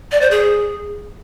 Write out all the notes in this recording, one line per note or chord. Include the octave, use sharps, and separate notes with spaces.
D5
C5
G#4